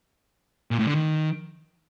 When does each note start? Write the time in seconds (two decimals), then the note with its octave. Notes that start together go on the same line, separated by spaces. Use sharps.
0.71 A#2
0.79 A2
0.87 D3
0.95 D#3